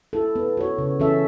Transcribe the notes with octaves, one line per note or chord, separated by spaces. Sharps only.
E4 A4
B3
F#4 C#5
C#3
E3 C#4 A4 E5